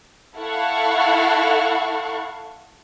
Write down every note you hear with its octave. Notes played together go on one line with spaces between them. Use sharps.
E4 A4 F5 F#5 C#6